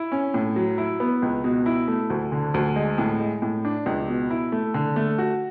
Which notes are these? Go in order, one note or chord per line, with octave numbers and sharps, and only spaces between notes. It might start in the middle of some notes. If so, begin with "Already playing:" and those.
Already playing: E4
C#4
A2
F#3
E4
B3
C#2
B2
E4
A3
D2
D3
D2
G#3
A2
G#3
A2
D4
C#2
B2
E4
A3
D3
A3
F#4